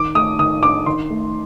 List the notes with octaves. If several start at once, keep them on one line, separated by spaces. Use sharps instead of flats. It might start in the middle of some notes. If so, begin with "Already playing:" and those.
Already playing: D#3 D6
A3 D#6
D#3 D#6
D4 D6
D#3 C6
A3